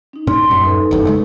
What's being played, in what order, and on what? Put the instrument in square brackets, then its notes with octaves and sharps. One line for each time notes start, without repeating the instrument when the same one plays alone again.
[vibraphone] C#4 D#4
[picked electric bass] A2 C#4 [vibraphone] C6
[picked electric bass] D#1 F#2
[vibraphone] D#4 A4 B4
[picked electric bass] F#1 E2 G2
C#3 G#3 A3